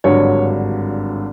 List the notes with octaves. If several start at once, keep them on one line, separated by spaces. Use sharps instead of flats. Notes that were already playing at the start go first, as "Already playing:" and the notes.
G#1 G2 D3 F#3 C#5